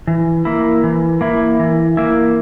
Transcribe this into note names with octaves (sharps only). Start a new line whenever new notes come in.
E3
A#3 E4
E3
A#3 E4
E3
A#3 E4